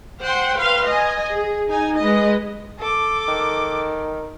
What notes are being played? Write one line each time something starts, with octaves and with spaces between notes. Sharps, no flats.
C5 F#5 G5 C6
B4 F5 C6
D#5 G#5
G#4
D#4 G#5
G#3 B4 D#5
A4 D6
D#3